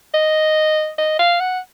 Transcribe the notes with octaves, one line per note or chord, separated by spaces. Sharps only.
D#5
D#5
F5
F#5